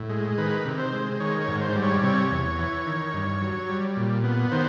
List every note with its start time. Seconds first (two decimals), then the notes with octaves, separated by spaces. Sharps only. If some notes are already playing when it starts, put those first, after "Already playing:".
Already playing: A2
0.10 G#3
0.38 D#3 B4
0.65 C3
0.79 C5
0.93 G#3
1.20 D#3 C#5
1.41 C#5
1.48 G#2
1.61 C5
1.75 G3
1.83 C#5
2.03 C3 C#5
2.31 E2
2.59 E3
2.86 D#3
3.14 G2
3.41 F#3
3.69 G3
3.97 A#2
4.24 B3
4.52 D#3 C5